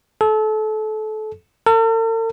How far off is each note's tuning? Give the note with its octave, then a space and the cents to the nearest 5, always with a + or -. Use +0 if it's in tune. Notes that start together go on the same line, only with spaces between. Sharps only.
A4 -30
A4 +45